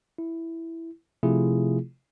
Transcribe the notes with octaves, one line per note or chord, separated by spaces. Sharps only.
E4
C3 F3 A3 E4 F4 G#4